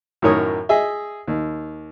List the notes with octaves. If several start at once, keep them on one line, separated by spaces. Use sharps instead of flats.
F#2 A2 D#3 A#4 C#5 D#6
G#4 D#5 E5
D#2